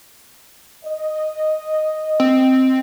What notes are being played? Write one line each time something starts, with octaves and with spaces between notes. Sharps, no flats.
D#5
C4